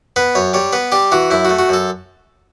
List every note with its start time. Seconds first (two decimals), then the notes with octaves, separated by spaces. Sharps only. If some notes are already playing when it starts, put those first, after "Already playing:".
0.16 B3 B4
0.35 F#2 C#5
0.53 G3 C#5
0.73 B3 B4
0.92 G3 G4
1.12 E3 F#4
1.31 F#2 E4
1.45 A3 F#4
1.59 F#4
1.69 F#2 A4